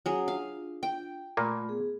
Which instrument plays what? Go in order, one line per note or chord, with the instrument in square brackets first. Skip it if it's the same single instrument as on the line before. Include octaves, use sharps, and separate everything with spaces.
[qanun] F#3 G#4 [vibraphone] C#4
[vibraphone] D4 F4 [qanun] F5
[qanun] G5
[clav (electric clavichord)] A#2 A#3 [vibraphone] A3 F4 B5
[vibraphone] B3 G#4